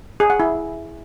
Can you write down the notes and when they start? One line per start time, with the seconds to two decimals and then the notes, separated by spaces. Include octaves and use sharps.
0.20 G#4
0.30 F#5
0.40 E4